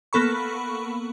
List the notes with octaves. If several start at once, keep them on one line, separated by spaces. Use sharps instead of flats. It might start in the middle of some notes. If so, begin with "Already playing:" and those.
A#3 B3 A4 B5 C#6